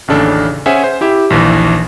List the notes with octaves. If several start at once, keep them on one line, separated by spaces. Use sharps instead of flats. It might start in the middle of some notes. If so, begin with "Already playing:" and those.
A1 D#2 C#3 D4 A4
C#4 G#4 C5 E5 F#5 G#5
C5
E4 G4 E5
A#1 D#2 E3